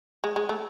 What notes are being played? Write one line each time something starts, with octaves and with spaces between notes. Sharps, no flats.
G#3
G#3
A3